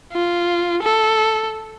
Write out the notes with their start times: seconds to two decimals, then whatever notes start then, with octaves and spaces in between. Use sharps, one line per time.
0.13 F4
0.83 A4